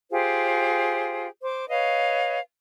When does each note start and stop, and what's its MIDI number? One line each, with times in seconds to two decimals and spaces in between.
0.11 1.27 65
0.11 1.27 67
0.11 1.27 68
0.11 1.27 72
1.43 1.68 72
1.43 1.68 86
1.69 2.39 71
1.69 2.39 73
1.69 2.39 75
1.69 2.39 77